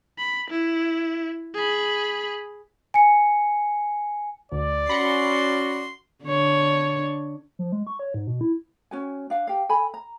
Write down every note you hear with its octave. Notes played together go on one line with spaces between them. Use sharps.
B5
E4
G#4 B5
G#5 C#7
D2 D5
C#4 F#4 B5 C6 A#6 C#7
D3 D4 C#5
F3
G#3
C#6
C#5
G#2
B2
E4
C#4 F#4 G#5
D4 F5 F#5
G4 F5
A4 G#5 B5
A#5